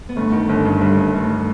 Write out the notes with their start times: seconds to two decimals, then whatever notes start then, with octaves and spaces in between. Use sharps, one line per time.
0.09 B3
0.16 G1 A3
0.32 D#3
0.49 G1
0.65 G2
0.81 G1 G3
0.98 G2
1.14 G1 A3